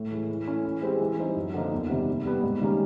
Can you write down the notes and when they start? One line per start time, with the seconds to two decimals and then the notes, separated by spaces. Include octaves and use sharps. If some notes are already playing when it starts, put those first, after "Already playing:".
Already playing: A2
0.11 E3 G#3
0.29 E3
0.47 A3 C#4 E4
0.64 E3
0.82 G#3 C4 E4 G4
1.01 E3
1.18 G3 C4 D#4
1.36 F#2
1.54 D3 F3 A#3 D#4
1.72 E2
1.90 C3 D#3 G3
2.07 A#2
2.26 G3 B3
2.43 G#2
2.61 D#3 G3 A#3 C#4